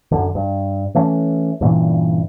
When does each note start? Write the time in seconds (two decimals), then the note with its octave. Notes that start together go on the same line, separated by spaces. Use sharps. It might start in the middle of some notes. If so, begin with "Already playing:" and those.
0.11 F#2 D3
0.35 G2
0.95 E3 A3 C#4
1.61 G2 A#2 C#3 E3